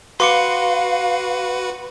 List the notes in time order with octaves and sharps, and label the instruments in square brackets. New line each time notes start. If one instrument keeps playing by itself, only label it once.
[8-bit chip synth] F#4 B4 [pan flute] F5 [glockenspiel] C6 D6 C#7